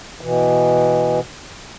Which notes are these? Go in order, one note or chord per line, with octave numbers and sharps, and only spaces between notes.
B2 E3